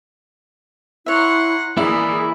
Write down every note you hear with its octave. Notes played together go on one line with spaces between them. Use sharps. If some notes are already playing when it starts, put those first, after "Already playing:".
E4 C#5 E5 F#5 A#5 C6
E3 G#3 A#3 E4 G#4 D5